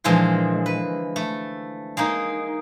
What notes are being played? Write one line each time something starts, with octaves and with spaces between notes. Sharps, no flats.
A#2 D3 E3 F3 G#3
B4
A3
G#3 A#3 D#4